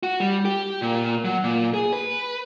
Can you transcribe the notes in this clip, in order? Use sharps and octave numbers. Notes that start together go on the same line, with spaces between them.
F#4
G3
G4
A#2
F#3
A#2
G#4
B4